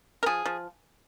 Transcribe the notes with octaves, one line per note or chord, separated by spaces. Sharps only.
A#4
F3 G#4
F3